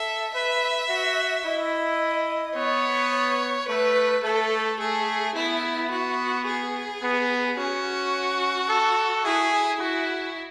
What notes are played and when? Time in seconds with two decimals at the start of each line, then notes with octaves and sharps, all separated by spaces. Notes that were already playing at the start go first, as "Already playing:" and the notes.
Already playing: A4 E5
0.34 B4 E5
0.90 F#4
1.45 E4 D#5
2.56 B3 C#5
3.68 A3 B4
4.23 A3 A4
4.79 A3 G#4
5.35 B3 E4
5.91 F#4
6.46 G#4
7.02 B3
7.57 C#4 F#4
8.69 A4
9.24 E4 G#4
9.80 E4 F#4